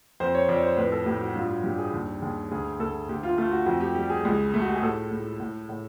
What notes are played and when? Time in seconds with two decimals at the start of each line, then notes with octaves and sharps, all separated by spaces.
0.20 F2 C5
0.35 C#5
0.48 F2 D5
0.63 C5
0.77 A2 B4
0.92 A4
1.06 A2 G4
1.21 F#4
1.35 G2 F4
1.51 F#4
1.64 G2 G4
1.78 G#4
1.93 D#2 G4
2.22 D#2 G#4
2.51 D2 G#4
2.80 D2 A4
3.09 D2 G4
3.23 F4
3.38 A3 F4
3.52 F#4
3.66 F2 F#4
3.81 G4
3.95 G3 G4
4.10 G#4
4.25 C#2
4.54 A3
4.61 F#4
4.69 G4
4.75 G#4
4.82 A2 A4
5.11 A2
5.40 A2
5.69 A2